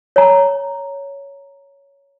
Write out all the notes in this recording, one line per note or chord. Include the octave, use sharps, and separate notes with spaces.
C#5 A#5